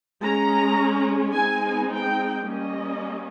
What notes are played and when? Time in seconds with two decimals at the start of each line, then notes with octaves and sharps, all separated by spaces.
0.23 G#3 C#4 A#5
1.35 G#3 C4 D#4 G#5
1.91 G5
2.46 G3 A#3 C#4 D#5